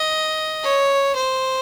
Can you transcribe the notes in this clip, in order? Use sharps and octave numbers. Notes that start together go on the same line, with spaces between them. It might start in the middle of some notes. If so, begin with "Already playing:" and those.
Already playing: D#5
C#5
C5